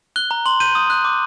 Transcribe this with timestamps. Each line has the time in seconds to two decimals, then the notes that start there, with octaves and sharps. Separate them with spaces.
0.16 F#6 G7
0.31 A#5
0.46 C6 F#7
0.60 G6 D#7
0.75 D#6
0.90 F#6
1.05 D6